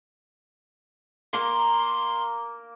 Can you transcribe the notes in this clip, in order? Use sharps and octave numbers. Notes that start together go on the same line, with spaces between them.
A#3 A#5 C6 D6